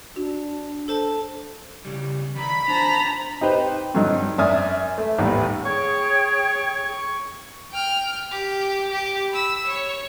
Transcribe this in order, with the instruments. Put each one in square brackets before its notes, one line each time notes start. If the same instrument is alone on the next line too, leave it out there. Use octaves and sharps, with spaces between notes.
[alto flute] D4 [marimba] F#4
[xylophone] A4 C5 A5
[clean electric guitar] C#3 G3
[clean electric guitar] D#3 D5 A#5 [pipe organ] B5
[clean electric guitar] D4 [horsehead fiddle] C5 A5 [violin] A#5
[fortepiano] D#4 G4 B4 C5
G2 D3 F#3 D#4
F#2 D5 E5 G#5 D#6 F6
A3
A1 D#2 G3 B3 D5
[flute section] G#4 C#5 G5 [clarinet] C#6
[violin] G5 F6
G4
G4
B5 E6
C#5